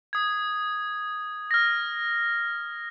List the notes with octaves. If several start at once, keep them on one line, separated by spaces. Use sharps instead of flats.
D#6 G#6
F6 A#6